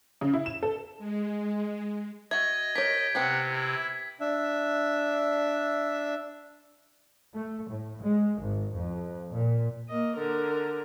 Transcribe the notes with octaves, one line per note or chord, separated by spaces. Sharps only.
C#3
E4
E7
A4
G#3
F#4 D#5 E5 G#6
G4 A#4 C#5 B6
C3 B3 C4 G4 F#5
E4
D4 E5
A3
A2
G#3
G#1
F2
A#2
A#3 D#5
D3 A#4